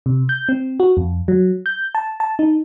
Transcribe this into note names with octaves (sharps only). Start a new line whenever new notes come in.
C3
G6
C4
F#4
F2
F#3
G6
A5
A5
D#4